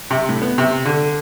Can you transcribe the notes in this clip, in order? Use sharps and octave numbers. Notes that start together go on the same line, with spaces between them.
C3
A2
B3
C3
D3